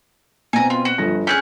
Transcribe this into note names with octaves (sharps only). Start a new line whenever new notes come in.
B2 C4 G#5 A#5
F4
F#4
G1 F3 A#6
C#4 G#4 F#6 G6